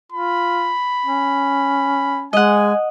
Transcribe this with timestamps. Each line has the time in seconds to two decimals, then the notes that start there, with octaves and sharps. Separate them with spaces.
0.12 F4 B5
1.06 C#4
2.33 G#3 D#5 F#5 G#5